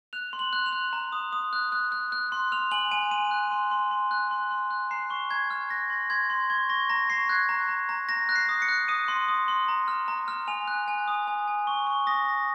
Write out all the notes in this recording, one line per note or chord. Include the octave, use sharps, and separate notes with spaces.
F#6 F7
C6
F#7
F#6
F7
F#6
A#5
D#6
D#6
F#6
F#6
F#6
F#6
C6
F6 F7
G#5 F#7
G#5 D#7
C6 D#7
F#6
C6
C6
C6
F#6
C6
C6
F#6
A#5 C7
C#6
A#5 G#6
F6
F#6 A#6
C6
C6 G#6
C6
C#6 G#6
C#6 A#6
A#5 A#6
C#6 C7
F#6 G#6
A#5
A#5
A#5
A#5 A#6
F#6
C7
D#6
C#7
F#6
D#6 D#7
C6
D#6
C6
A#5
F6
A#5
F6
G#5 F7
F#6
G#5
D#6
G#5
G#5
C#6
C#6
D#6 A#6
D#6